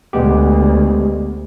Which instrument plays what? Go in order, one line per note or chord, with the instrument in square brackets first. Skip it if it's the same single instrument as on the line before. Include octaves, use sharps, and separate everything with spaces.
[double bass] D2 [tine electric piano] G#3 B3 G4